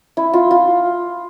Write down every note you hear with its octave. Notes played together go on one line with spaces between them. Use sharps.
E4
F4
F4